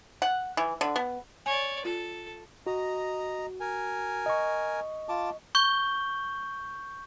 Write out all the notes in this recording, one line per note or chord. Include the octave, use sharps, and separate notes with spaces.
F#5
E3
D3
B3
C#5 D5 G#5
F4 A4
F#4 D#5 A#5
A#4 G#5
D#5 C#6
F4 A5 D6
C#6 G6 G7